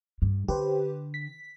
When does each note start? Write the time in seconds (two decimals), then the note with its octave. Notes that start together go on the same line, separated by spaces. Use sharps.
0.22 G2
0.48 D3 G4 B4 C5
1.14 B6